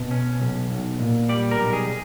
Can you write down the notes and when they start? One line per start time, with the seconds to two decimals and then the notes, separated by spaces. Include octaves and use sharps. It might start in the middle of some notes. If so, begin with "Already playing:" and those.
Already playing: B2
0.11 C#4
0.42 B1
0.70 B1
1.00 A#2
1.29 G3 D5
1.51 A#4
1.58 B1
1.73 G#4